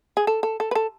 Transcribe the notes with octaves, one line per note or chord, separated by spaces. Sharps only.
G#4
A4
A4
A4
B4
A4